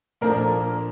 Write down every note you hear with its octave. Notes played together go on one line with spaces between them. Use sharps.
A#2 F3 A#3 D4 A4 A#4